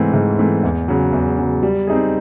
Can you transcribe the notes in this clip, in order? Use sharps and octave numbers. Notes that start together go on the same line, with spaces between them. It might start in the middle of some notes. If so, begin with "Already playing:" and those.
Already playing: G#2 E3 A3 C4
G#2
E3 A3 C4
E2
C#3 F#3
E2
C#3 F#3
G3
C4 D#4 G#4